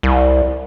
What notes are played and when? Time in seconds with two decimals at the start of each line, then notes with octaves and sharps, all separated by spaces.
0.03 C2